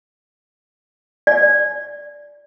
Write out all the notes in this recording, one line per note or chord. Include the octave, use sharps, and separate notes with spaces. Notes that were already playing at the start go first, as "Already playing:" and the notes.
D5